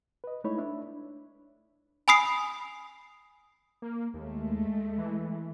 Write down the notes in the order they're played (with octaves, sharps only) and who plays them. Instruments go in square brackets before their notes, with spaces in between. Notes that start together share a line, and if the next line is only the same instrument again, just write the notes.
[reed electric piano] B4 D#5
G#3 A3 D#4 E4 C#5 B5
D4 E5
[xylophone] G#5 B5 D#6 C7
[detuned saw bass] A#3
[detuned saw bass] D#2 [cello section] G#3 A3
[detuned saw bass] E3